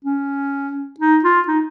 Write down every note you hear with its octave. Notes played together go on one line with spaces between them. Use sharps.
C#4
D#4
F4
D#4